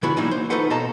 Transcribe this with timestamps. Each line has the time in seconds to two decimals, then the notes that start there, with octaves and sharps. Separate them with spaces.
0.03 D3 G#3 B3 E4 F#4 B5
0.17 E3 F#3 G3 A#3 D#4 E4
0.31 C5
0.50 A3 D#4 F4 A4 B4 F#5
0.70 B2 A4 D#5 F5 A5 A#5